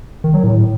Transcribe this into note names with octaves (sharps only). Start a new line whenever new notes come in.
D#3
F#3
A2